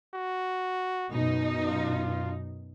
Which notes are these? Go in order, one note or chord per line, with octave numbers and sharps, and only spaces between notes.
F#4
F#2 B2 D#4
F4